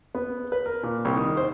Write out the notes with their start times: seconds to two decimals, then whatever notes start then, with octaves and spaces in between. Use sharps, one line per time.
0.15 B3
0.52 B4
0.66 A#4
0.83 A#2
1.05 C2
1.17 D#3
1.37 C5